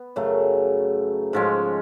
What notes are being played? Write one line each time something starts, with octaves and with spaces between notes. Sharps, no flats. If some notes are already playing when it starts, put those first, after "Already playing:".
Already playing: B3
F#2 C#3 F#3 A3
G#2 F3 G#3 C#4